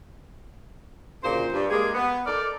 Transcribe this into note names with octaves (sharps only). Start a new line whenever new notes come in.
D2 A#2 C#3 C5
G2
G#3 A#3 G4 G#4
B3
D#4 A4 A#4 D5